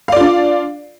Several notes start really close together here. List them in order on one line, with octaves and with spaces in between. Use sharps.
F5 D5 F4 D4